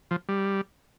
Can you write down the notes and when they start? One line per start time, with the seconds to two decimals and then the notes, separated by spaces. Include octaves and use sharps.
0.11 F3
0.29 G3